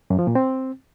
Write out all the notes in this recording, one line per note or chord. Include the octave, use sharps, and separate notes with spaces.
F#2
F3
A#2
C4